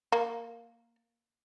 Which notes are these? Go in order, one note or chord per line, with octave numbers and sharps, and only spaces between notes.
A#3